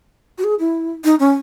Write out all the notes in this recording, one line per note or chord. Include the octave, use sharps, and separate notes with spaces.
F#4
G#4
E4
D#4
C#4